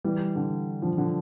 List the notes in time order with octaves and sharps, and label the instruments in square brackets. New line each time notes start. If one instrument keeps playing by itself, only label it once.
[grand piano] E3 G3
D3
D3 F3
D3